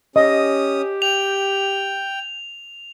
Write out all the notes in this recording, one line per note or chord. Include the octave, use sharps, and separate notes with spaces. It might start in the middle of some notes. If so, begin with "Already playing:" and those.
C#4 G4 D#5 D#6
G5 F7